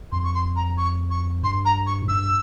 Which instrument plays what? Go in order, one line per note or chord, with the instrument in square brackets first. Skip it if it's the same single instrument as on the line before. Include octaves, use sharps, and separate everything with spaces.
[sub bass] F2 [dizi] C6
[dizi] C#6
C6
A#5
C#6
C#6
[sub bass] G2 [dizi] C6
[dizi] A#5
C#6
[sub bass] G#2
[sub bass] G2 [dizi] E6